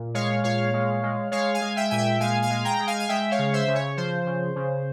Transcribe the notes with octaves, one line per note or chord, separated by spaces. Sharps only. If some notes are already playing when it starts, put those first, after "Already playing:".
Already playing: A#2
G#3 C#5 F5
A#2 C#5 F5
G#3
G#3
G#3 C#5 F5
F5 G#5
G#3
E5 G5
A#2 G#5
E5 G5
G#3 F5 G#5
F5 G#5
G#3
G5 A#5
G#3
F5 G#5
F5
G#3 E5 G5
C#5 F5
C#3
C5 E5
C#3
C#5
F3 C5
C#3
C#3